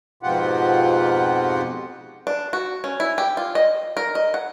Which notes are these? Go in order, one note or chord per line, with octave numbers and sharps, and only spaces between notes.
F2 G#2 B2 F4 G4 F#5
D4
F#4
C#4
E4
G4
F4
D#5
A#4
D#5
F#5